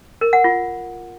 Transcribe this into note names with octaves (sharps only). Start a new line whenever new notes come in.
A#4
F#5
F4